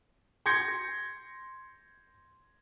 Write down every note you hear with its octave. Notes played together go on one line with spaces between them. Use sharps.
C6 G6 G#6 A#6 C#7